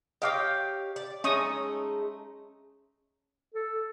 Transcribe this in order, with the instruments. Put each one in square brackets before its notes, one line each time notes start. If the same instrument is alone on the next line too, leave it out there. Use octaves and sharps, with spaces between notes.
[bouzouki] G4 C#5 G5 [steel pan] D#5 F5 D6
[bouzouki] D5
[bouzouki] G#3 A3 D#4 [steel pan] C#4 C#6 D#6
[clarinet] A4